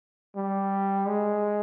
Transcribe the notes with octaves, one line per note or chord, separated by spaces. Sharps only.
G3
G#3